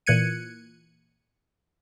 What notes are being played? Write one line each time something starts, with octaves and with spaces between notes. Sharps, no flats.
A#2 E3 F#6 G#6 C#7 D#7